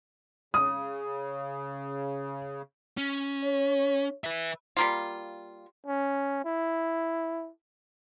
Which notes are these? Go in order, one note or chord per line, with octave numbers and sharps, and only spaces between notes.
C#3 D#6
C#4
C#5
B4 E5
G3 A#3 F4
C#4
E4